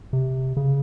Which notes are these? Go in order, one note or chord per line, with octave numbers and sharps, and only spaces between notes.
C3
C#3